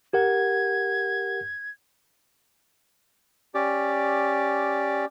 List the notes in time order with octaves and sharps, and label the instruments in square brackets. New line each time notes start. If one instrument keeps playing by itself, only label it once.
[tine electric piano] G4 A#4 F#5 [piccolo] G#6
[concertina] C#4 G4 D5